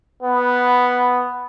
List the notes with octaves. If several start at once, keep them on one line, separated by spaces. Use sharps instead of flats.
B3